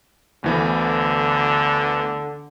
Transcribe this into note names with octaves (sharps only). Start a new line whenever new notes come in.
D2 D3 E3 B3